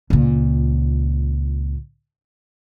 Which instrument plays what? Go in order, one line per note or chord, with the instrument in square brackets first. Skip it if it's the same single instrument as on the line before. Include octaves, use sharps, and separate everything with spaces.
[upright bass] C#2 A#2